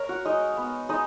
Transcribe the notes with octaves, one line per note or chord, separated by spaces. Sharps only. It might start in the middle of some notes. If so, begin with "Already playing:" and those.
Already playing: A#4 C#5 A#5
F#4 F#5
G#3 D#4 D#5
B3
G#3 D#4 D#5